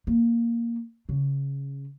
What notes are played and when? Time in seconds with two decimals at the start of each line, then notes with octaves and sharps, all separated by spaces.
0.07 A#3
1.09 C#3